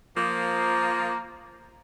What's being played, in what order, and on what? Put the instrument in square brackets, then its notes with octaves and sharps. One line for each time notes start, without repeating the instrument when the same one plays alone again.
[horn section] F3 A#3